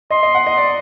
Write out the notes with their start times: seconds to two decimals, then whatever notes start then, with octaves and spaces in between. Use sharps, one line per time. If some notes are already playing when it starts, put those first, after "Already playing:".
0.10 D#5 C6
0.23 D#5
0.35 F#5
0.47 D#5
0.57 D5